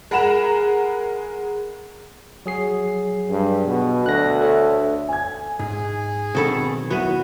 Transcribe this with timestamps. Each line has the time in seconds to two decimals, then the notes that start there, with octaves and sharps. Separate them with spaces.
0.11 G#3 A#4 F#5 A#5 B5 E7
2.46 F#3 G#4 C7
3.30 G2
3.65 B2
4.06 D2 F#6 A#6
4.41 A4 C#5 E5
5.09 G#5 G#6
5.59 G#2 G#4
6.35 B1 D#3 C4 F#4 A4 B5
6.90 F#3 B3 E4 F#4 B4 D#7